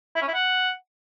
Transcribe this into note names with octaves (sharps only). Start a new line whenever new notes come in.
E4
C#4
E4
F#5